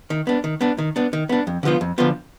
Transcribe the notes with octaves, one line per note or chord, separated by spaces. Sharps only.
D#3
B3 D4
D#3
B3 D4
D#3
B3 D4
D#3
B3 D4
F2
D3 F3 B3 F4
F2
D3 F3 B3 F4